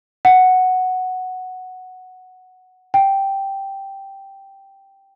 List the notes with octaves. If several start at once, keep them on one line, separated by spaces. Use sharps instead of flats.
F#5
G5